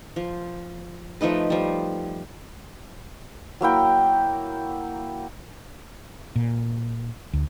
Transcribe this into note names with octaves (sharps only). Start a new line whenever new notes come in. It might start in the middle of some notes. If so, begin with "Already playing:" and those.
F3
F3 A3 D#4 B4
F3 G3
F#3 A#3 E4 G5
A#2
D2